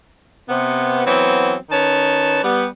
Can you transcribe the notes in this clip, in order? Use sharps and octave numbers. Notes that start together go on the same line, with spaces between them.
C3 B3
E3 F#3 B3 C4
D#3 C#4 B4 A5
G3 B3